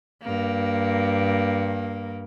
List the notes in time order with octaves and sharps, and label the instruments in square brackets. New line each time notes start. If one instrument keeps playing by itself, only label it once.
[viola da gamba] G2 A#3